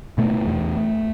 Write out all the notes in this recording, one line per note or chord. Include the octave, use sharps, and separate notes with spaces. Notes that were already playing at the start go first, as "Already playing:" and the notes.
B2 A3
E2